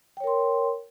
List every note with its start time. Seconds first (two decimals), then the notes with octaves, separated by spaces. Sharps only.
0.17 G5
0.20 C#5
0.24 A#4
0.27 C6